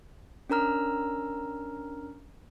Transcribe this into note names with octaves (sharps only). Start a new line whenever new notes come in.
C#4 D4 A#4 A#5 F6